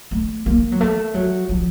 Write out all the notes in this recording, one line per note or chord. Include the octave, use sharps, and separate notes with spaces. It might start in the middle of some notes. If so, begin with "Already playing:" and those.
A3
A#3
F#3
A3
F#3
F3